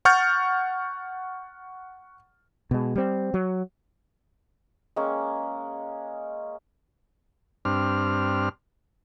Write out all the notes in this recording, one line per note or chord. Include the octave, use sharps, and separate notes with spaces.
F#5 C#6 F6 G6 A6
B2 G#3
G3 C4
F#3
G#3 A#3 C#4
G2 C4 D4 F6